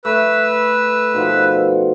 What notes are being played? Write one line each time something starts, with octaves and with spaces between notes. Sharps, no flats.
A3 B4 E6
B2 D#3 F3